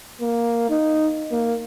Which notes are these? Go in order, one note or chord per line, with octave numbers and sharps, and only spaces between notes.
A#3
D#4
A#3